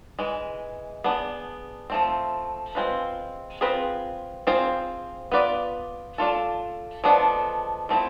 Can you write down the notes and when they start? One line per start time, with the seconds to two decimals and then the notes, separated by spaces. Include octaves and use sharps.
0.19 E3 G#3
1.04 B3 D4 G#4
1.90 F3 A3 C4
2.75 G#3 C4 F4 B4
3.61 C4 F4 G#4 B4
4.47 C4 F4 G#4 C5
5.32 B3 F4 B4 D5
6.18 A3 D4 F4 A4
7.04 F3 G#3 B3 D4 A4
7.89 F3 A3 C4 E4